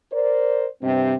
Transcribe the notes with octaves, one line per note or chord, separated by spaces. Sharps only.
A#4 C5 D5
G2 C3 C4